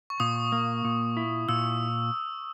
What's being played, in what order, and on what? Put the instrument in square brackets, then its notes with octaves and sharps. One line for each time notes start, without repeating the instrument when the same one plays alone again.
[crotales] C#6
[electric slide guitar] A#2 [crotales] D#6
[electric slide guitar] A#3
A#2
E4
[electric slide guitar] A#2 [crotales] E6